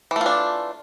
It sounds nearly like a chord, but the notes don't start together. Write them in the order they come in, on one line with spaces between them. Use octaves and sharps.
E3 A3 F4 D4